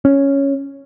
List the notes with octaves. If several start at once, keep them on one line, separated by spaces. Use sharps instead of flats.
C#4